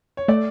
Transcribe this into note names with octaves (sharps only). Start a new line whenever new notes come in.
C#5
A3 D5